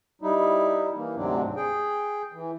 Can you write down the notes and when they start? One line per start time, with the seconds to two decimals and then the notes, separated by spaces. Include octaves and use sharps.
0.22 G3 D#4 E4
0.95 E3 A#3
1.16 D2 G#2 C3 F#3 C4 D4
1.56 G#4 G5
2.32 E3